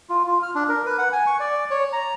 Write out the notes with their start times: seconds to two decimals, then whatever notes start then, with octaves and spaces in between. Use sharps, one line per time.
0.09 F4
0.27 F4
0.43 F6
0.55 D4
0.69 A#4
0.86 B4
0.98 F#5
1.12 G#5
1.27 C#6
1.40 D5
1.70 C#5
1.93 A#5